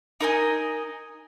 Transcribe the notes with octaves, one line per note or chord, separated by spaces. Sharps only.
D#4 A#4 D#5 G#5